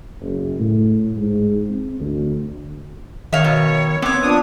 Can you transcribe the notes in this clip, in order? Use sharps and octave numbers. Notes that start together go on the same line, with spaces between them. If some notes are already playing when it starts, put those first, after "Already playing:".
F#1
A2
G#2
C4
D2
D#3 C#5 E5 F5
B2
B3 C4 C#5 D6
F3 D4 D#6